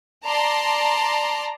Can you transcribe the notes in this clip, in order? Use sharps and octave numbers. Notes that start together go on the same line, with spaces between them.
D5 A5 A#5 C6